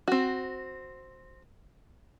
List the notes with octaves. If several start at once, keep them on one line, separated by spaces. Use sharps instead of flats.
C4 F#4